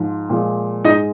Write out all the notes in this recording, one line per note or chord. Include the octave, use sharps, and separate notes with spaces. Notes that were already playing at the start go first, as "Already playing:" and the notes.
Already playing: G#2 F3 G#3
A#2 F3 G#3
G#2 G#3 D#4 D#5